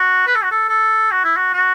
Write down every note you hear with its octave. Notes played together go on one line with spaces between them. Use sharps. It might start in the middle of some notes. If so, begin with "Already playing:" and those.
Already playing: F#4
B4
A4
F#4
A4
A4
F#4
E4
F#4
F#4